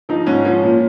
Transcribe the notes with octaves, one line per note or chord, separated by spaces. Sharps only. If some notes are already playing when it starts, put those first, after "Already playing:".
F3 D#4
G#2 C#4
F3 C#4
A#2